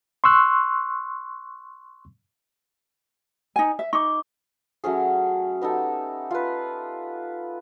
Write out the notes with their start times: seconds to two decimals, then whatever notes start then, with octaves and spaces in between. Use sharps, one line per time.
0.24 C6 C#6 E6 F#6
3.56 D#4 G#5
3.79 E5
3.93 D#4 C#6 D6
4.84 F#3 A3 C#4 G#4
5.61 B3 D#4 G4 A4
6.31 F4 B4